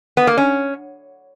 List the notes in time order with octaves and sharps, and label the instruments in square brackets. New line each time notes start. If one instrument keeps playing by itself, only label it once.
[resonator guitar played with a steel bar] B3
A#3
C#4